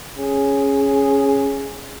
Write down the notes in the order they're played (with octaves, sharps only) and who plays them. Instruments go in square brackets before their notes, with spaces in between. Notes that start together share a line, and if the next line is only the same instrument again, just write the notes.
[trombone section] C#4 G#4